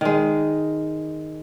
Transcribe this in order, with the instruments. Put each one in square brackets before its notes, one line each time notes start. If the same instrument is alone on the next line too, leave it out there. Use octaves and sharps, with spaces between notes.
[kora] D#3 G#3